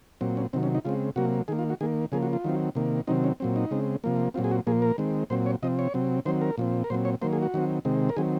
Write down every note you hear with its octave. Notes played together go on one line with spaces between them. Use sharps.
A#2 F#3 C4
C#4
C3 D#3 F#3 C4
C#4
D#4
C#3 G#3 C4 F4
C3 F#3 A#3 F#4
D#3 A#3 G#4
F4
F#4
D#3 A#3 G#4
C#3 F3 A#3 G#4
F#4
F4
D#3 F#3 C4
C3 D#3 A#3
C3 D#3 F#3 C4 D#4
C#4
A#2 F#3 C4
D#4
C#3 G#3 C4
C3 F3 A#3
A#2 F#3 C4 F4
G#4
F#4
A#2 F3 A#3 G#4
A#4
D#3 G#3 C4
A#2 F#3 C4 C5
C#5
C3 F3 C4 D#5
C#5
C3 F#3 C4
D#3 F#3 C4 C5
A#4
A#2 F3 C4
A#4
A#2 F#3 C4 C5
C#5
D#3 F#3 A#3 C5
G#4
F#4
D#3 F#3 C4
C3 D#3 G#3 C4
A#4
D#3 F#3 C4 G#4